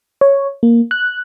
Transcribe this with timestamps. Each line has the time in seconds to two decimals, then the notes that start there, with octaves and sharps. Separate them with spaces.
0.21 C#5
0.63 A#3
0.91 F#6